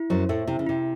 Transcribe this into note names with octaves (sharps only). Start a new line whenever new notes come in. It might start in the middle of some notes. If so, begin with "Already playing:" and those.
Already playing: E4
F#2 F#3 C5
A2 A3 E5
C3 E4
C#3
C3 E4